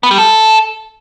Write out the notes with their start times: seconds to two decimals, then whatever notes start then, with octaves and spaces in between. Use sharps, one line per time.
0.03 B3
0.11 G3
0.18 A4